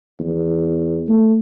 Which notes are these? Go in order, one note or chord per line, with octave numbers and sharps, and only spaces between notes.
E2
A3